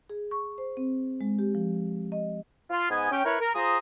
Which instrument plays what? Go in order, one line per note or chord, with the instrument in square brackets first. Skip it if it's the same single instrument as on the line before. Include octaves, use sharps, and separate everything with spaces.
[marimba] G#4
C#6
C5
C4
G#3
G4
F3
D#5
[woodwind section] F4
G#2 B3 D#5 G#5
C#4 G5
E4 A#4 B4 C#5
A#4
F4 G#4 C5 A#5 D#6